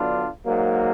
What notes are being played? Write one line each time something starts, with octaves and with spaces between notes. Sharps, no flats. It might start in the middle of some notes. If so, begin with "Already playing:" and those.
Already playing: D3 F#3 B3 D4 F4
G#2 F#3 A#3